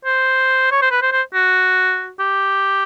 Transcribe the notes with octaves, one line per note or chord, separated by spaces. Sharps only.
C5
C#5
C5
B4
C5
C5
F#4
G4